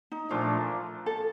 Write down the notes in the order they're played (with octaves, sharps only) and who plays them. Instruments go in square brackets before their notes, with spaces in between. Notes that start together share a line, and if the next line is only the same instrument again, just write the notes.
[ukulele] D#4
[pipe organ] A#2 F3 A3 D4 [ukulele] F4
[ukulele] A4